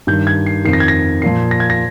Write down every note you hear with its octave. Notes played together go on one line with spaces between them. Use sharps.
G2 D#3 G6
G#6
C7
F2 D#3 C7
A#6
G#6
A#6
A#2 F3 C7
A#6
G#6
A#6